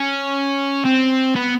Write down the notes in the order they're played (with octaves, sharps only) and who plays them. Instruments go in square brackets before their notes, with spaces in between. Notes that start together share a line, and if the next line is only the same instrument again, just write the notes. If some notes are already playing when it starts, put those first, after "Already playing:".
Already playing: [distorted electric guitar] C#4
C4
B3